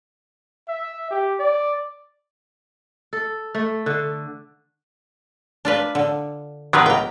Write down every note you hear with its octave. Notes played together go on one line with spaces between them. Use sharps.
E5
G4
D5
A4
A3
D3
D4 F4 B4
D3
D3 D#3 F#3 B3 A#4 B4
C#2 G5 A#5